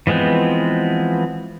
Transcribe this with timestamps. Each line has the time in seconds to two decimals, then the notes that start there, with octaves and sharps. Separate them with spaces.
0.07 E3 F3 G#3 B3 C4